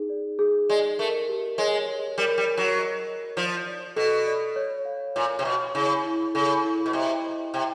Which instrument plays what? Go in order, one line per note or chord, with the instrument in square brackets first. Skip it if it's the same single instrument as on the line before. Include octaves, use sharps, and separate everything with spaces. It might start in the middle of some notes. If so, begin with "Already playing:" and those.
Already playing: [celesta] D#4 G#4
D5
G#4
[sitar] G#3 [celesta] D5
[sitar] A3 [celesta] A#4
[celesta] G4
[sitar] G#3 [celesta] C#5
[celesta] C#5
[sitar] G3 [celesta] A#4
[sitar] G3
[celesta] G#5
[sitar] F#3
[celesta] D#5
D#5
[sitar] F3 [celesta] D5
[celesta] D5
[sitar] B2 [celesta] A4
[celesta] D5
C#5
F5
[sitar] A#2 [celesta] C#5
[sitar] C3
[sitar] B2 [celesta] C#5
[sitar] C#3 [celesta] E4
[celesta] E4
[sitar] C#3 [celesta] A4
[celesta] E4
[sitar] B2
[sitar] C3 [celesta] D#5
[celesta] D#5
[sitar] C3 [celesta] G5